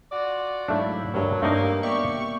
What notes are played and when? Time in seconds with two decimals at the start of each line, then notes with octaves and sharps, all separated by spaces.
0.11 F4 F#4 D5
0.68 G#2 F#3 A3 D4 E4 F5
1.14 D2 G2 F#3 G4 A#4 C#5
1.42 G2 A3 A#3 C4 D#4
1.83 A#3 B3 G4 D5 E5 C#6